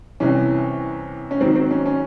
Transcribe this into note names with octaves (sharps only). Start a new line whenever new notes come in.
C2 C3 E3 C#4
C#4
G#2 D#3 F#3 C4
C4
C#4
C#4